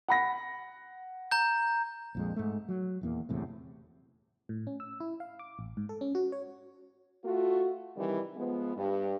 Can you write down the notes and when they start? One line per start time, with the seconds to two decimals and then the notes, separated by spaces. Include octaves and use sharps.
0.08 F#5 B5 A#6
1.31 A#5 G6
2.15 A#1 F2 G#3
2.36 G#2 A3
2.69 F#3
3.01 D#1 E2 A#3
3.29 F#1 E2 A2 C3
4.49 A2
4.67 C#4
4.80 E6
5.00 E4
5.20 F5
5.39 D6
5.59 A1
5.77 G#2
5.89 A4
6.01 C#4
6.15 F#4
6.32 C#5
7.25 A3 F4 F#4
7.97 C3 D#3 E3 G3
8.37 F3 G#3 B3
8.77 G2